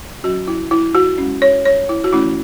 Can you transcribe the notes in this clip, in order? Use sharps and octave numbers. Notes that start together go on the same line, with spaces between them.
F#3 C#4 F#4
E4
E4
F#4
G#3 C#4
C#5
C#5
E4
F#4
E3 A3 C#4 E4